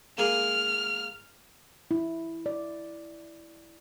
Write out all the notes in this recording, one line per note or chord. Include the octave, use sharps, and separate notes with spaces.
G#3 A#3 G#4 F6
E4
D5